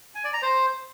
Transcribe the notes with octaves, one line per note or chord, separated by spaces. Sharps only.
G#5
D5
A#5
C5